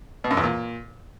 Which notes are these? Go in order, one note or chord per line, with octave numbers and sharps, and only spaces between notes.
B2
F#2
E2
A#2